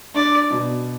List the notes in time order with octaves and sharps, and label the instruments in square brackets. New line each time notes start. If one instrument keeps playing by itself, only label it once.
[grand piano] D4 [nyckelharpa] D5
[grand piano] B2